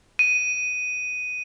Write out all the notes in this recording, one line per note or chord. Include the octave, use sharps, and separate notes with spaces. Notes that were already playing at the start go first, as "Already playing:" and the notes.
D#7